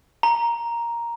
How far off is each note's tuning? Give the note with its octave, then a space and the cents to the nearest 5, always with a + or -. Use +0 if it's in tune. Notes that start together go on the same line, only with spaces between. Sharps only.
A#5 +5